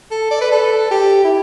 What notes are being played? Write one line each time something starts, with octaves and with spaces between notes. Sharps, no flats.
A4
D5
B4
A4
G4
E4